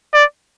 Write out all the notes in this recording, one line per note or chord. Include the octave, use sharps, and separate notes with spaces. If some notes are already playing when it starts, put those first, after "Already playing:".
D5